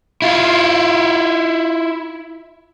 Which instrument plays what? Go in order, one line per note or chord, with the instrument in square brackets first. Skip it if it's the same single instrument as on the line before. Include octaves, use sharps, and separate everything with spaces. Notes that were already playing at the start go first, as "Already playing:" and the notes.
[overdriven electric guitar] E4 F4